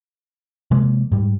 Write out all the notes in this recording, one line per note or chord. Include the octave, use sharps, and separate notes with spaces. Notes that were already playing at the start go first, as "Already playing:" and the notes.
C3 F3 G#3 A#3
G#2 G3